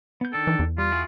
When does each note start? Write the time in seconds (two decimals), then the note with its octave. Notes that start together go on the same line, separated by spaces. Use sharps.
0.21 B3 G6
0.33 D#3 D4 A4 G5
0.47 E3
0.59 E2
0.78 G3 F4
0.92 E4 F#4 G#4